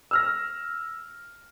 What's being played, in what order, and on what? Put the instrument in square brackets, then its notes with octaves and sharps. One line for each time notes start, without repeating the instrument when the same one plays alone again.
[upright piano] E6 F6 A#6